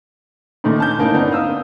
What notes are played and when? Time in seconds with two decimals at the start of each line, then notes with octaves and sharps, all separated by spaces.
0.64 A#2 D#3 A3 C#4 D#4
0.78 G#5 A5 G6
0.98 G1 A#3 D#4 E4
1.14 B3 C4 D4 D#4 A#4
1.31 F5 D#6 E6